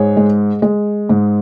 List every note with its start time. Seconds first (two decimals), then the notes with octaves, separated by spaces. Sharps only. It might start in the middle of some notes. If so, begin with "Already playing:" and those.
Already playing: G#2 G#4 C#5
0.17 G#3
0.62 G#3
1.09 G#2